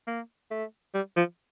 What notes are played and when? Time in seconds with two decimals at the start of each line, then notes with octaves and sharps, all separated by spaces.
0.07 A#3
0.51 A3
0.95 G3
1.16 F3